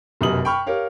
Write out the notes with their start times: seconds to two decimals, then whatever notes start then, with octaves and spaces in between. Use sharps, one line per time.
0.21 F1 F#2 B2 G4 D#6 F#7
0.45 G5 B5 C#6 F6
0.67 G4 A#4 C#5 F5